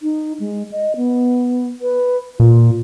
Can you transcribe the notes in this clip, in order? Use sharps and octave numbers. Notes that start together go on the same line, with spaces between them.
D#4
G#3
D#5
B3
B4
A#2 F4